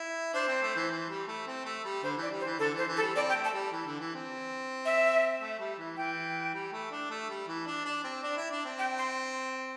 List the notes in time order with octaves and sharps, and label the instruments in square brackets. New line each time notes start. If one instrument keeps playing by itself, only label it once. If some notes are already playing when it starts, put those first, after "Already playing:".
Already playing: [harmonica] E4
[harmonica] D4 [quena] C5
[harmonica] C4
A3
E3
E3
G3
A3
C4
A3
G3
[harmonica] D3 [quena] C5
[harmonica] E3 [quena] D5
[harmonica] G3
[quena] C5
[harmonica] E3
[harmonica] D3 [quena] A4
[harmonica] E3 [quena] C5
[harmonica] E3
[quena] A4
[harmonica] G3
[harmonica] C4 [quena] D5
[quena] G5
[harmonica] A3
[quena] A5
[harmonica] G3
E3
D3
E3
C4
[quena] E5
[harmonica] A3
G3
E3
[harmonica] E3 [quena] G5
[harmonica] G3
A3
D4
A3
G3
E3
D4
D4
C4
[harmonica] D4 [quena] D5
[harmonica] E4
D4
C4
[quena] G5
C6